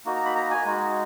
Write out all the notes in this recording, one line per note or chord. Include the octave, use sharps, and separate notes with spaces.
A#3 D#4 F#4
A#5
B5
A#5
G#5
G#3 D#4 F#4